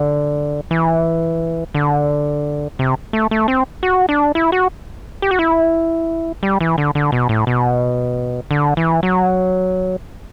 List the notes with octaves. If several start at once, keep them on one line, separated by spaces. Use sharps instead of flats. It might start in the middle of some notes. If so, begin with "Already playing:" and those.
Already playing: D3
E3
D3
C3
A3
A3
C4
F#4
D4
E4
F#4
G4
F#4
E4
G3
E3
D3
D3
B2
A2
B2
D3
E3
F#3